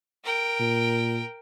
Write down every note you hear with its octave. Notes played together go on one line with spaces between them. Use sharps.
A#4 G5
A#2